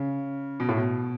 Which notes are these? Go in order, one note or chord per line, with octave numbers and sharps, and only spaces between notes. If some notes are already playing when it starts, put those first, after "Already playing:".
Already playing: C#3
B2
A2
B2